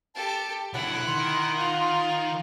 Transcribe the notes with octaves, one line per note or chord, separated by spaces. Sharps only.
G4 A4 A5
B1 D3 E4 F#5
D#3 C6
F4